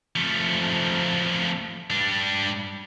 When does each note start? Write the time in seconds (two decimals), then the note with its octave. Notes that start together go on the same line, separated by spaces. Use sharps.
0.16 F3 A3
1.90 G3 D4